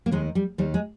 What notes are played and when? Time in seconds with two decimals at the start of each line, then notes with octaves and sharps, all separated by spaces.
0.06 A#3
0.11 D#2 D#3 G#3
0.35 G3
0.58 D#2 D#3 G3
0.74 G#3